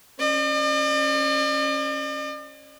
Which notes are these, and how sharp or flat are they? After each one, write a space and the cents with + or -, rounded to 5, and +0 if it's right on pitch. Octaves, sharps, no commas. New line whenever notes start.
C#4 -25 D5 +45